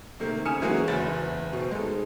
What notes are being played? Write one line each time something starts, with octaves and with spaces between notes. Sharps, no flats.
C3 D#3 A3 A#3
C#3 G#5 D#6 F6 C#7 E7
E3 F#3 G#3 A#3 C#4 F#4
F#1 E2 B5 A6
B2 C4
G#3 D#4 A4